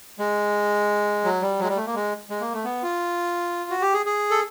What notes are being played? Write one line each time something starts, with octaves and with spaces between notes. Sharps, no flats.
G#3
F#3
G3
F#3
G#3
G3
A3
A#3
G#3
G#3
A#3
A3
B3
F4
F#4
G4
G#4
G#4
A4